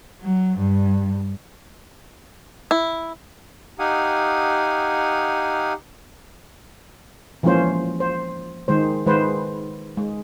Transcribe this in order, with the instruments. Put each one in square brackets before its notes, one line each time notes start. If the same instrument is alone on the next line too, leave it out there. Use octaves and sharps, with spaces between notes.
[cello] F#3
G2
[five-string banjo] E4
[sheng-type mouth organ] D#4 G4 F5 F#5 G#5 D#6
[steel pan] E3 F3 G#3 A#3 C#4 C5
C5
D#3 G#3 C5
D#3 G#3 B4 C5
G#3